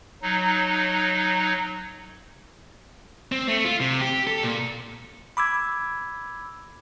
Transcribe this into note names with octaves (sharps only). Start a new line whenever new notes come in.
F#3 D#4
C4
A3
F4
C3
G4
A4
A#2
B5 D6 E6 G#6